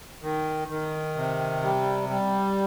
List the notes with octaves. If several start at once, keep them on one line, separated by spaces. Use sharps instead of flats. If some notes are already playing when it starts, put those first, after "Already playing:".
D#3
D#3
C3
G3
G3